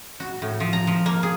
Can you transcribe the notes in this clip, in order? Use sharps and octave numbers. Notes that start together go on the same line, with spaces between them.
F#4
A2
F3
A#5
F3
A#3
G#4